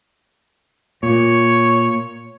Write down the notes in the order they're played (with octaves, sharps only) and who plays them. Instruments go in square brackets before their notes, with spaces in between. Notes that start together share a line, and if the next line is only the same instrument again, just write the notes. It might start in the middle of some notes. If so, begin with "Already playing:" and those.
[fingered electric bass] A#2 [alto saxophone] C#5